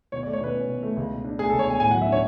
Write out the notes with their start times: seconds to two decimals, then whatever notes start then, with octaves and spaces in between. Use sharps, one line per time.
0.12 B2 C#5
0.23 D5
0.27 A3
0.33 C#5
0.40 B2 B4
0.55 C#4
0.69 B2
0.83 A3
0.97 C#2
1.10 B2
1.24 D4
1.39 A3 G#4
1.50 A4
1.53 C#2
1.59 C#5
1.66 B2 G#5
1.80 A2 G#5
1.91 F#5
1.94 F#3
2.01 E5
2.08 D4 C#5